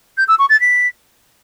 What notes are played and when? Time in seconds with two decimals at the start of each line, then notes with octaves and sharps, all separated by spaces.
0.17 G6
0.28 E6
0.39 C#6
0.49 A6
0.60 B6